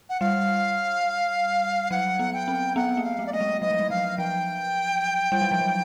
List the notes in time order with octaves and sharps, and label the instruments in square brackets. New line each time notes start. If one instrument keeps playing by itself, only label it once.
[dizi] F#5
[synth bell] G3 [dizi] F5
[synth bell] F#3 [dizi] F#5
[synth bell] B3
[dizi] G5
[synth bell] C4
[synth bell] B3 [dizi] F#5
[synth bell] A#3
[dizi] F5
[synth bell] A3
[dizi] D5
[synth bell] A3 [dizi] D#5
[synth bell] G#3
[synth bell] F#3 [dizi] D#5
[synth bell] F3
F#3
[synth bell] F3 [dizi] F5
[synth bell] F3 [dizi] G5
[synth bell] G3
F#3
F3
F#3